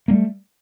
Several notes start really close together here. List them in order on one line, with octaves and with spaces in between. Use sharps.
A#3 G3 A3